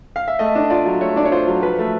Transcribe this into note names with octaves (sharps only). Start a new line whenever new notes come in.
F5
E5
A3 D#5
D4
F4 D5
F#3
A3 C#5
D4 D5
C#5
F4 C5
F#3
F3 B4
A3